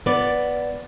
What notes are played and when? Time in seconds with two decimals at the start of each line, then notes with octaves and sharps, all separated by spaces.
0.06 B3 D5